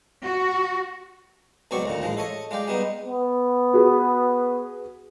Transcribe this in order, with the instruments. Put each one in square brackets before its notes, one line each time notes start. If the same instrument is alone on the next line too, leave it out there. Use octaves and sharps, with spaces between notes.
[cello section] F#4
[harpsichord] C#2 B2 F#3 C4 D5 C#6
D2 A#2 D#3
A1 F3 G#3
A4 C#5 D#5
G#3 F4 D5 G5
G3 G#3 B3 D#4
[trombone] B3
[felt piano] F#4 G#4 B4